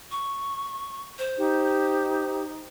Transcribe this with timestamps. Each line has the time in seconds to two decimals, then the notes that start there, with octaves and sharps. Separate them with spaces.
0.11 C#6
1.18 C5
1.38 D#4 G4